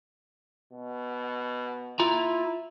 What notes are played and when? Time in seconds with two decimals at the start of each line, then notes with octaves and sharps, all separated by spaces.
0.73 B2
2.00 E4 F4 A#5